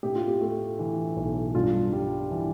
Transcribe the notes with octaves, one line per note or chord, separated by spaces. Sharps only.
A2 G4
F4
G4
A3
E3
B1
G2 F4
G3
E3